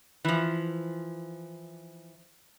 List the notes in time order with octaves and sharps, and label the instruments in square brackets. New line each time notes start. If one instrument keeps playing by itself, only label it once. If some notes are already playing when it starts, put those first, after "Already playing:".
[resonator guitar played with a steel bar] E3 F3